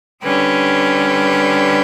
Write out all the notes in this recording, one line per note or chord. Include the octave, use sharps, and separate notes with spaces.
D3 G3 C#4 G4 B4